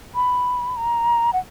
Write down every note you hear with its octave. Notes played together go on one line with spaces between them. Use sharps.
B5
A#5
F#5